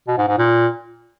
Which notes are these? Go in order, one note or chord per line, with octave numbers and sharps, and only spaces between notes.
B2
G#2
G#2
A#2